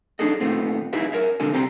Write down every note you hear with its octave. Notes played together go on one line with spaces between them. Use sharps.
D4 D#4 G#4 A4 D#5
A#2 D#3 E3 A3 B3 C4
D#4 E4 F#4 G#4 B4 E5
A#4 C#5 E5
A#2 D3 G#3 D4 A4 G#5
C2 G3 C4 A5 A#5 C6